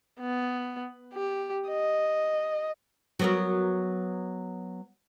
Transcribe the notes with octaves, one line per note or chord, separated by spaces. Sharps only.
B3
G4
D#5
F#3 B3 A#4